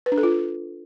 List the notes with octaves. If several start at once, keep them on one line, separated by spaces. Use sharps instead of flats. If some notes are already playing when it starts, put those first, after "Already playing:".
B4
D4
A4
F4